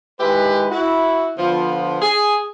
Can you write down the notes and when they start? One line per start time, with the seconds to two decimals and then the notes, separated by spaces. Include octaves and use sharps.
0.20 D#3 G#3 E4 G4 B4
0.71 E4 F#4
1.38 D3 F3 B3
2.02 G#4